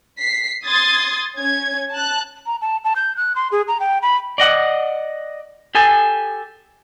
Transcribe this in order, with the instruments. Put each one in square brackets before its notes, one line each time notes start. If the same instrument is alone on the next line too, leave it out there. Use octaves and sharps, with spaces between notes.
[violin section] B6 C7
C6 D#6 G#6 A6
C#4 G#6
A5 F#6
[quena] A#5
A5
A5
G6
F#6
C6
G#4
A#5
G5
B5
[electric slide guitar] D5 D#5 F#5
G4 A4 G#5